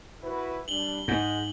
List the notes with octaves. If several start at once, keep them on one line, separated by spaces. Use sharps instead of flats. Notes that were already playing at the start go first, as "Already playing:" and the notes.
E4 F#4 B4
G3 D4 F#7 G7
G#2 G#3 F#5 G6 A#6